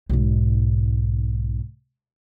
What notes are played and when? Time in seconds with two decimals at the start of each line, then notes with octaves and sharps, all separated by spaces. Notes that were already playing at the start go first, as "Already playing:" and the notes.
0.09 B1 G#2